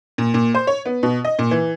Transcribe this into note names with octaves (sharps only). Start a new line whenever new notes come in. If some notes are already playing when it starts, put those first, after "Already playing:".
A#2
A#2
C5
C#5
B3
B2
D#5
A#2
E3